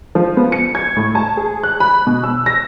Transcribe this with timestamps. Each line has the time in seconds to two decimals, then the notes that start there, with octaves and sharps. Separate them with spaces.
0.15 F3
0.37 B3
0.52 C#7
0.75 G#6
0.96 A2
1.15 A5
1.37 G#4
1.63 F#6
1.80 B5
2.07 B2
2.24 E6
2.46 A#6